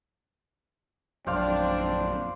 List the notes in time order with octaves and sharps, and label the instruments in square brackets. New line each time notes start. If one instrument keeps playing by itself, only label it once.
[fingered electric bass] A#1 F#2 [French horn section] C4 D4 [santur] C5 D5 F5